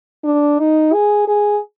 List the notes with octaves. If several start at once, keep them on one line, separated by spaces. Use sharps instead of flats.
D4
D#4
G#4
G#4